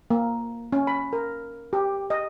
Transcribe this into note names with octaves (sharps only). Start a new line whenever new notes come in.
A#3
C#4
B5
A#4
G4
D#5